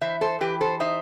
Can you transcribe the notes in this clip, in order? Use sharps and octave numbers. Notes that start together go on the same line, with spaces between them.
E3 C5 E5
A4 C5
E3 G4 B4
A4 C5
D#4 C5 E5